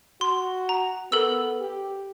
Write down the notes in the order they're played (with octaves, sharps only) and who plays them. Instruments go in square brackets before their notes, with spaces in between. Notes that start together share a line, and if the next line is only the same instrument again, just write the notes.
[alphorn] F#4 [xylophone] C6
[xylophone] A#5
[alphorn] B3 [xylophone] A4 A#4 E6
[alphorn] G4